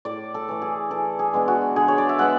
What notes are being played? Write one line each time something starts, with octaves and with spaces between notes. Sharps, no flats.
A2 D5
A4
E3 A3
G#4
E3 A4
G#4
G#3 B3 D4
F#4
D3 G#4
C#5
D5
E5
G#3 B3 F#5